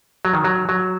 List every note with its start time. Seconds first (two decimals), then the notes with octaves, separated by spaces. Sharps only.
0.25 F#3
0.33 D#3
0.45 F#3
0.69 F#3